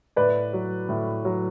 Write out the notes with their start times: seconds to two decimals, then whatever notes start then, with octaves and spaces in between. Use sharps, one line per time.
0.16 A2 B4 D5
0.53 F#3
0.89 A2
1.25 F#3